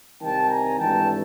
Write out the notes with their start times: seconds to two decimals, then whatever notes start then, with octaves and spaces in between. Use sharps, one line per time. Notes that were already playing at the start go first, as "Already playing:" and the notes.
0.21 C2 C3 D#3 G5 A5
0.49 G#5 A#5
0.77 G#1 G2 E3 A3 G5 A5